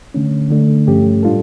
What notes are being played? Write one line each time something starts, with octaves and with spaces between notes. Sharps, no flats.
D3 A3 C#4
D3 A3 D4
G2 F3 A3 C#4 G4
A2 G3 D4 F4 A4